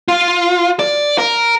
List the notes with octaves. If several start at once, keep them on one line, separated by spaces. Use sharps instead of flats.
F4
D5
A#4